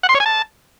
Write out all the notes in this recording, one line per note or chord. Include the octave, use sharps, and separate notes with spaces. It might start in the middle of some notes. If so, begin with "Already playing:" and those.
F#5
C6
C#5
G#5
A5